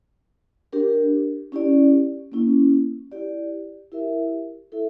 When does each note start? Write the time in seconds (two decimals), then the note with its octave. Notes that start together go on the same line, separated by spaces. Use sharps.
0.73 D4 G4 A#4
1.52 C#4 E4 G4 D5
2.32 A#3 C#4 E4
3.12 E4 G4 D5
3.92 E4 G4 A#4 E5
4.72 E4 A4 E5